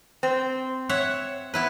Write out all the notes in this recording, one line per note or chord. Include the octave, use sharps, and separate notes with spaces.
C4
C#5 E5 F#5
B3 E4 B4